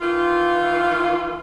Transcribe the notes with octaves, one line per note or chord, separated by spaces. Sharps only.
D#3 E3 F4